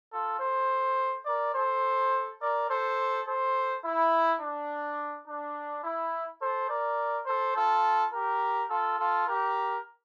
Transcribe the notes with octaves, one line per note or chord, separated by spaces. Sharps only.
F4 A4
A4 C5
A#4 D5
A4 C5
A#4 D5
A4 C5
A4 C5
E4
D4
D4
E4
A4 C5
A#4 D5
A4 C5
F4 A4
G4 A#4
F4 A4
F4 A4
G4 A#4